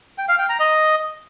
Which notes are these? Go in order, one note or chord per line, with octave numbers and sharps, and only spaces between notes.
G5
F5
G5
A#5
D#5